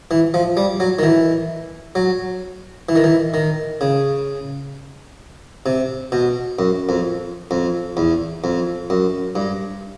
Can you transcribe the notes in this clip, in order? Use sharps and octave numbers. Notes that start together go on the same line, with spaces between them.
E3
F3
G3
F#3
D#3
E3
F#3
E3
D#3
E3
D#3
C#3
C3
B2
F#2
F2
F2
E2
F2
F#2
G2